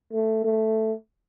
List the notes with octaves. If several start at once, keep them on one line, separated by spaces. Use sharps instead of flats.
A3
A3